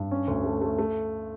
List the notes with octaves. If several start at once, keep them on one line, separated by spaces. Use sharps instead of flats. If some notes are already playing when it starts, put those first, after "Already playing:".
Already playing: G2
C#4
D2
A3
A3
A3